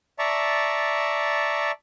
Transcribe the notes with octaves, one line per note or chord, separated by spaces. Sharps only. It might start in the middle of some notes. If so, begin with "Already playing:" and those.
D5 E5 A5 A#5 C#6